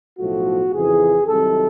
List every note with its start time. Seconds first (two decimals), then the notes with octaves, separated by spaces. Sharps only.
0.19 B1 A2 F3 A3 F#4
0.73 F2 C#3 E3 G#4
1.27 C2 C3 D#3 F#3 A4